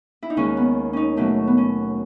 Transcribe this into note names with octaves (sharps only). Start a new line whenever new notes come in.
E4
D#4
D#2 D#3 G#3 C#4
B3
C#4 D#4
B2 F#3 A3 C#4
B3
C#4